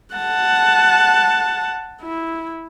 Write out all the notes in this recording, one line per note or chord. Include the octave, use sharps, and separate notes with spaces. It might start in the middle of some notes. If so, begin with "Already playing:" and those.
F#5 A5
E4